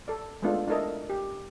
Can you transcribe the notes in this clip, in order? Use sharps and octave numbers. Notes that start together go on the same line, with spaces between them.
A4 D5
G#3 A3 B3 D4 F4 A4
D4 E4 A4 A#4 D#5
G4